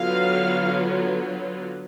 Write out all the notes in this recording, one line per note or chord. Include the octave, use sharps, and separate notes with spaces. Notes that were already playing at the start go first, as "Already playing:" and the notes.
Already playing: D3 F#3 B3 F4 F5